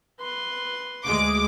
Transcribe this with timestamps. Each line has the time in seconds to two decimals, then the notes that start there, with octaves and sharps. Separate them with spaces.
0.20 B4 C6
1.06 D2 G#3 D6